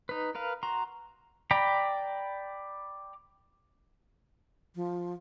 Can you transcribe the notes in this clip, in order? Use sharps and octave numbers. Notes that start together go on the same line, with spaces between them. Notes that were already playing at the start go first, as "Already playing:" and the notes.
D#4 B4
A#4 B4 F5
F#4 A#5 C6
D5 G5 A#5 B5
F3